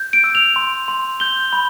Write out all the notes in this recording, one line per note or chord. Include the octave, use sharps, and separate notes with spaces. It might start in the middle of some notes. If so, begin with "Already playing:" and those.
Already playing: G6
D7
E6
F7
C6
C6
G6 G7
B5